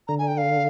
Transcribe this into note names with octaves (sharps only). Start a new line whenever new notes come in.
D3 A#5
G#5
G5
F5